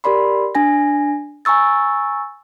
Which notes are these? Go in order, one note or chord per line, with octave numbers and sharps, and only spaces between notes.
G4 A#4 D5 B5 C6
D4 G#5 A#6
G#5 A#5 C#6 E6 A6